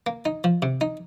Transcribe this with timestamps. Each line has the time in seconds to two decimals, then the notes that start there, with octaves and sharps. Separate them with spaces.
0.06 A#3
0.25 D#4
0.44 F3
0.62 C3
0.81 D#4